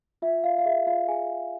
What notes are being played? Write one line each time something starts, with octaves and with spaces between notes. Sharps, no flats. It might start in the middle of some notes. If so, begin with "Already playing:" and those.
F4 E5
F4 F5
F5
G#4 E5
F4 F5
G#4 G#5
G#4